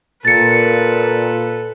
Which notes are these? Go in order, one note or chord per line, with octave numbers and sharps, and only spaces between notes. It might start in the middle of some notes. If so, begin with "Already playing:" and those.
A#2 A4 B4 A6 C#7